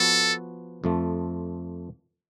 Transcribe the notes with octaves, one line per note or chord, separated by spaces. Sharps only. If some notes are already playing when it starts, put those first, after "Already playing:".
Already playing: F3 B3 F#4 A4 B4
F2 F3 A3